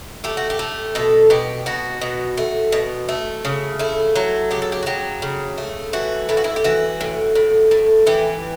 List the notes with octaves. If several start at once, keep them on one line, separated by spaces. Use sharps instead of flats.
A3 G4
F#4
G4
A3
B2 A4
B2 G4
B2 F#4
B2
A3
B2
A3
C#3
A3 E4
F#3 E4
C#3 G4
A4
G4
F#4
F#3 G4
C#3
A3
E3 F#4
A2 E4
F#4
E4
G4
E3 F#4
A2
A2
A2
E3 G4